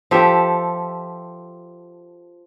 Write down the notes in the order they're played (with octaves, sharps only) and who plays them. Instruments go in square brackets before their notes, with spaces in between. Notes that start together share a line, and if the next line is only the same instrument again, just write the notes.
[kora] F3 G4 A4 E5